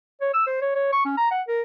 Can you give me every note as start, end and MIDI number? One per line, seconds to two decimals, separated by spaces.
0.21 0.32 73
0.34 0.45 88
0.47 0.57 72
0.62 0.73 73
0.75 0.88 73
0.92 1.02 85
1.05 1.17 61
1.17 1.30 82
1.31 1.41 78
1.48 1.62 70